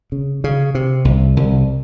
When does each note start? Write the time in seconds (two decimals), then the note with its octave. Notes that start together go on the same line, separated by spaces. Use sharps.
0.12 C#3
0.44 C#3
0.75 C3
1.05 C2
1.36 C2